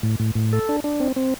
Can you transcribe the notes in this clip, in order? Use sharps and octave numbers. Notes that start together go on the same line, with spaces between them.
A2
A2
A2
A4
D4
D4
C4
C4